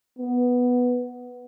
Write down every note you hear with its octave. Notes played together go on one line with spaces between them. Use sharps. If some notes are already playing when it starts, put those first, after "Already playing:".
B3